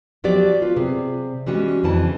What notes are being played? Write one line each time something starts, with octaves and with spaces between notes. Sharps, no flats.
F3 F#3 B3 G4 D5
F4 B4
C3 G#4
E3 G3 G#3 B3 C#4 F#4
F2 C#3 E3 A5